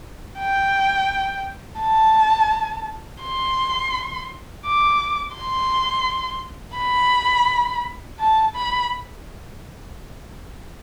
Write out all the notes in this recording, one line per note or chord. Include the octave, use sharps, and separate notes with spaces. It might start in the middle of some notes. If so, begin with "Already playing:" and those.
G5
A5
C6
D6
C6
B5
A5
B5